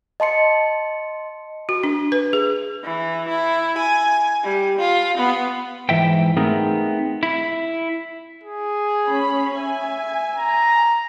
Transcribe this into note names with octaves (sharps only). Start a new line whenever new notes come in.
D#5 A5 C6 C#7
F#4
D4
B4
G#4
E3
E4
G#5
G3
F4
B3
G#2 E3 E5 G5
A3 B3 C4 D#4 G#4 A#4
E4
G#4
C#4 C#5 B5
E5 G#5
A#5